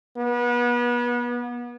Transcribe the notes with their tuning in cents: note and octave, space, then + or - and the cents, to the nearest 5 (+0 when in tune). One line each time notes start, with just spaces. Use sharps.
B3 -35